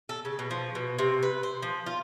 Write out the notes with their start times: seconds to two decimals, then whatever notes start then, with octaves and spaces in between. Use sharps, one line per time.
0.09 A4
0.25 C#3
0.39 B2
0.51 F3
0.75 B2
0.99 C3
1.23 B4
1.43 C5
1.63 F3
1.86 F4